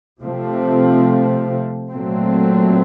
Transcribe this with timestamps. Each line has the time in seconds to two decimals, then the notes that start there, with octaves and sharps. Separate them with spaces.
0.20 C3 F3 A3 C4
1.91 A#2 F#3 A3 C4